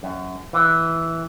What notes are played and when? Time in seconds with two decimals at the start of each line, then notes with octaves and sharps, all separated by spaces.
0.03 F#2
0.53 E3